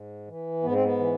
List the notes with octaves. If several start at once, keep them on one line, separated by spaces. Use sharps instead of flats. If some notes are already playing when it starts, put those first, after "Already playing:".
Already playing: G#2
E3
G#2 B3
C4
B3
E3